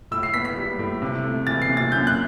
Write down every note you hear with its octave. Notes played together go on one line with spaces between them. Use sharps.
A2 E6
C7
B3 B6
B6
G3
A2
C3
A3
E3 A6
C7
C3
A6
F#2 G6
F#6